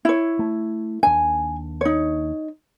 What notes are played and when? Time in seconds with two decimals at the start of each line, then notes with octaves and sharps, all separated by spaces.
0.05 E4 C#5
0.39 A3
1.03 D#2 D4 G#5
1.81 D#4 C#5